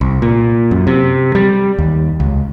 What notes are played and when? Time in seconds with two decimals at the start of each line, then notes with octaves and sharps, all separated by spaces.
0.01 C2
0.22 A#2
0.71 F#2
0.87 C3
1.35 G3
1.79 D#2
2.20 C#2